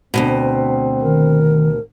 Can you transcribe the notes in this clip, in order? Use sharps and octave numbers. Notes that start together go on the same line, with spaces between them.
D2 G#2 B2 C4
D#3 A#4